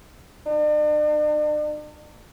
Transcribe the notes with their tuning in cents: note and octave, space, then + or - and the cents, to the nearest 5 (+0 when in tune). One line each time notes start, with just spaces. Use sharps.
D4 +45